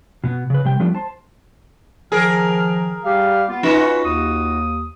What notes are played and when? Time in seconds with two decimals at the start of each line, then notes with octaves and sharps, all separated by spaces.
0.24 B2 B3
0.50 C#3 B4
0.65 C3 G3 G5
0.80 F3 G3 A3 B3 D4
0.95 C5 A5
2.12 D#3 F3 G#4 A#4 F6
3.04 G3 G4 F5
3.48 B3 F4
3.63 C#4 D#4 F4 F#4 B4
4.04 D#2 D#6